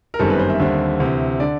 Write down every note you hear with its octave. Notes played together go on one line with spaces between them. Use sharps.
A#4
G1 F#2 D#3 G3 C4 A4
B4
C5
E5
D#2 D3 G3 C4
D2 C3 E3
D3 D5